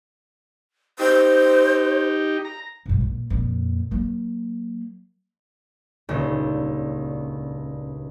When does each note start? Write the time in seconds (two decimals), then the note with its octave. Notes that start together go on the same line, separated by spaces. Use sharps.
0.99 D#4 G4 C5
2.45 A#5
2.86 B1 G2
3.01 A#2
3.30 F2 A#2
3.91 F#3 A#3
6.09 D#1 C#2 A#2 D4